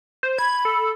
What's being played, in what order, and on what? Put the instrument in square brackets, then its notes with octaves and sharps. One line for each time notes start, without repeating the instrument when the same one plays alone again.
[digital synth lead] C5
[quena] B5 [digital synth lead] G#6
[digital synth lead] A4